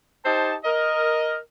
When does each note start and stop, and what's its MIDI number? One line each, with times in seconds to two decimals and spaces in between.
0.24 0.54 63
0.24 0.54 67
0.24 0.54 72
0.24 0.54 81
0.64 1.36 70
0.64 1.36 75